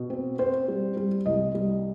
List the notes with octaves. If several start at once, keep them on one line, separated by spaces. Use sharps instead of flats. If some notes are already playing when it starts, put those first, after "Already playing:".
Already playing: B2
C4
C4 C5
G3
G3
C2 D#5
G3